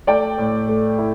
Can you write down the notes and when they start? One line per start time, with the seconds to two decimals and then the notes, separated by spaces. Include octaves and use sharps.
0.07 A3 D5 G5
0.38 A2
0.69 A3
0.99 E4